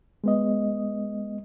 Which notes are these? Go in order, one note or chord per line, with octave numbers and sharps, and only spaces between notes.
G#3 B3 D#5